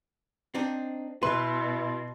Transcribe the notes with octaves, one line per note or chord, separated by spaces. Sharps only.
C4 D4 D#4
B2 E4 B4 C6